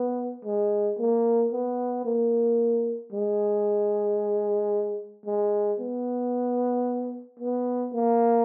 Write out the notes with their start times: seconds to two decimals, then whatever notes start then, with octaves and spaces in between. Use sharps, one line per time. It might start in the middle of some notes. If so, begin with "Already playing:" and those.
Already playing: B3
0.45 G#3
0.99 A#3
1.52 B3
2.05 A#3
3.12 G#3
5.26 G#3
5.79 B3
7.39 B3
7.94 A#3